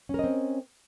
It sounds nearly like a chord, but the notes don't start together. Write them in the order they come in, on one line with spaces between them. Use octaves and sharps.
C#4 A#4 D#5 C4